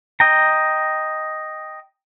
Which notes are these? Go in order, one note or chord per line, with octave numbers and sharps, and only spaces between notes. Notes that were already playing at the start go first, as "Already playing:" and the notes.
D#5 G5 A#5